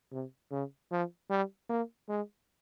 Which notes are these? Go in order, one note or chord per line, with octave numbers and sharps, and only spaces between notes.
C3
C#3
F3
G3
A#3
G#3